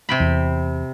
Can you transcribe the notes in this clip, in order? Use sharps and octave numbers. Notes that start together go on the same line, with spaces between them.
C3 G5 B5
E2